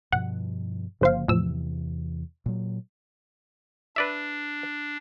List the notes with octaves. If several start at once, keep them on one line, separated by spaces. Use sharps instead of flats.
G2 B2 F3 F#5
G1 C#3 F3 A#3 C5 F5
E2 A2 C3 E3 F3 E6
A#2 F#3
D4 B4 D5 E5